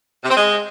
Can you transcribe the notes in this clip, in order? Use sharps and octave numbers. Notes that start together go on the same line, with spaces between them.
C3
C4
G#3